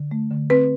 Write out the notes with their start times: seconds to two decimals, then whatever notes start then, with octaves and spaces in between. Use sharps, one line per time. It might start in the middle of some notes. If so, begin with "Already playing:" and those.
Already playing: D3
0.11 A3
0.31 D3
0.50 C4 B4